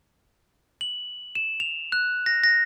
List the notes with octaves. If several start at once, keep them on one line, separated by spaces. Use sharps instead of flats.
F#7
E7
F7
F#6
A#6
A#6